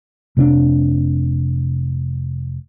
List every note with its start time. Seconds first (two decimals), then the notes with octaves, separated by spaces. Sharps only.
0.37 F1 C3 C4 D4